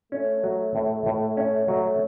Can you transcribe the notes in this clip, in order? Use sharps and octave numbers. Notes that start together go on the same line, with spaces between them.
A3 C#4
F#3
A2
A2
C#4
F#3